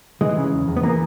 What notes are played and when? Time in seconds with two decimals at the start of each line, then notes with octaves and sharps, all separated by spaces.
0.21 E3 G#3
0.37 C#3
0.53 E2
0.68 E2
0.77 B3
0.83 E3 A#3